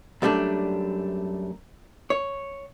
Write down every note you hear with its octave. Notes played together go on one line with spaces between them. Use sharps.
F#2 G3 A3 C#4 D4
C#5